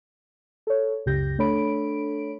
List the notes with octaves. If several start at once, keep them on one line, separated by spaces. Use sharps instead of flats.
A4 C#5
C#2 F#2 C#3 G4 G6 A#6
A3 D4 A4 C#5 B5 D7